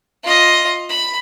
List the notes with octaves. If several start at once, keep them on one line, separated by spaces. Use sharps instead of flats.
F4 D#5
B5